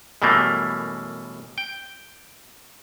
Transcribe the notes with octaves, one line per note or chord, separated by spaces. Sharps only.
F#2 B2 E3 G3 A3 A#3
G5